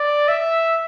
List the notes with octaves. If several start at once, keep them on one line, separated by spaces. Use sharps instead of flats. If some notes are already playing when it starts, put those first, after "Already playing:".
Already playing: D5
E5